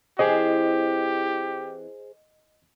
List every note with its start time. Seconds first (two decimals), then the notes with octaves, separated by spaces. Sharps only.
0.19 E3 C4 E4 G4 G#4 C5 D#5